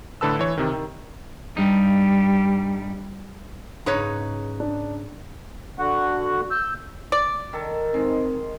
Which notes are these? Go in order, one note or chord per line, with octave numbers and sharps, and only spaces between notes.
A2 D3 A4 B4 A5 E6
E3 C#5
C3 D#3
D#3
G2 G3 D#4
G#2 C#3 D#4 B4 C#5 F#6
D4
D3 F#4 F#5
E6 G6
D5
D#3 A4
G#3 C4 D#4